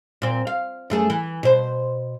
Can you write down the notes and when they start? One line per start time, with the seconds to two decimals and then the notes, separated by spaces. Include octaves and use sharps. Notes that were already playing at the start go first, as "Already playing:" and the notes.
0.22 A#2 C4
0.47 F5
0.90 F#2 A3 G#4
1.10 E3
1.43 B2 C5